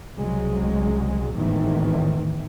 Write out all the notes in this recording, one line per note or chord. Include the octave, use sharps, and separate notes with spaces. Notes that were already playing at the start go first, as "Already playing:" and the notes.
C2 C#3 F#3 G#3
G#1 E2 A2 D#3 E3